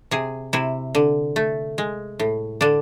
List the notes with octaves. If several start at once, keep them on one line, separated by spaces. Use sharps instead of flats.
C3 G#4
C3 E4
D3
A3
G#3
A2
D3 D4